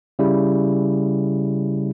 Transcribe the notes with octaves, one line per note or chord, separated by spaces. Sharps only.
C#3 G3 E4